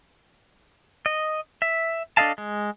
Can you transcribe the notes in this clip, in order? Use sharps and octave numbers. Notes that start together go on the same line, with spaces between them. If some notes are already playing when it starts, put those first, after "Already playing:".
D#5
E5
D4 A4 D#5 F5 A5
G#3